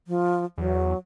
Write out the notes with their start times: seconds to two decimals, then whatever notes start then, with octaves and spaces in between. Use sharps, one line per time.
0.07 F3
0.58 E2 F#3